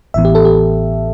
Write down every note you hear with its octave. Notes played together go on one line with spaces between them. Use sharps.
A1 A2 E3 B3 E5
G4
A4
G4